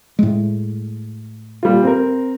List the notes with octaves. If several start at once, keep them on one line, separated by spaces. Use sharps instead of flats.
A2 G#3
A#2 G3 F4
C4 A#4